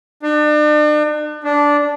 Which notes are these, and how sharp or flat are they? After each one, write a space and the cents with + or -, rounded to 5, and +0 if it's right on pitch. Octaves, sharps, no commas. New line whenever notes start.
D4 +40
D4 -10